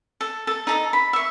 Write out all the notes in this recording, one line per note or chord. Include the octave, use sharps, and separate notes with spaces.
A4
A4 A5
D#4 A4 A#5
B5
E5 C#6